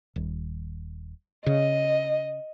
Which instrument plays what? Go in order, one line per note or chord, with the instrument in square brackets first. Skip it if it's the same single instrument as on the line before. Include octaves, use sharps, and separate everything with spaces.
[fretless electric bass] D#1
[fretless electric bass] C#3 [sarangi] D#5